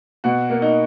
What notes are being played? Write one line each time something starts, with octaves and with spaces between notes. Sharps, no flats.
B2 F#4
A#3
D#4